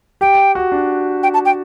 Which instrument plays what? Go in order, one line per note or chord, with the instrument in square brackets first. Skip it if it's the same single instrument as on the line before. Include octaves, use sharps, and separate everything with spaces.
[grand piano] G4 [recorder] G5
[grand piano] F#4
D4
[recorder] G5
A5
G5